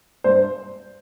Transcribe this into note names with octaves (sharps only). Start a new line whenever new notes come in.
G2 C5